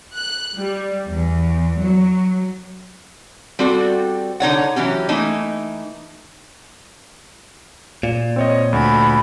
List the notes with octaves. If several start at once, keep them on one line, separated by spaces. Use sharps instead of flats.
F#6
G3
E2
F#3
G3 C4 F#4 A4
D3 D#4 C#5 F#5
E3 F#3 C#4 G4
E3 A3 A#3 D#4
A#2
C4 C#5 D#5
D2 B5